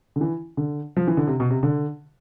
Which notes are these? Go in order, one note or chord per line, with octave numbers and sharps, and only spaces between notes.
D3
E3
D3
F3
E3
D3
C3
B2
C3
D3